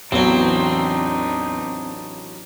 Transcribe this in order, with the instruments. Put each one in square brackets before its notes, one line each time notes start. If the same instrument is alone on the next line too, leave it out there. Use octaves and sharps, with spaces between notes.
[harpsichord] A1 F#3 [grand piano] E2 [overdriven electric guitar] C4 [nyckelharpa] D4 D#4